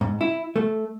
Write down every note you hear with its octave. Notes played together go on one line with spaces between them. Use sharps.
G#2
E4
A3